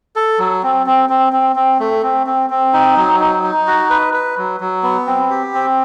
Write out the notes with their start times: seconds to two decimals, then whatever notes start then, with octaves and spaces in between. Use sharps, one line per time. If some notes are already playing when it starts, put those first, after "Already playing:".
0.16 A4
0.39 F#3
0.63 C4
0.86 C4
1.10 C4
1.33 C4
1.56 C4
1.80 A3
2.03 C4
2.27 C4
2.50 C4
2.73 D#4
2.96 F#3
3.20 D#4
3.43 D#4
3.67 F#4
3.90 B4
4.14 B4
4.38 F#3
4.60 F#3
4.83 B3
5.07 C4
5.31 G4
5.54 C4